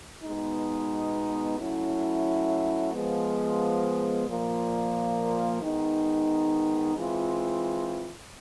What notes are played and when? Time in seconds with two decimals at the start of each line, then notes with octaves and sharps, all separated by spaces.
0.24 B2 G#3 B3 D#4
1.59 F#3 A3 C#4 E4
2.93 F3 G#3 B3
4.27 A#2 F3 A#3
5.61 D#3 G#3 B3 D#4
6.95 E3 G#3 C4 F4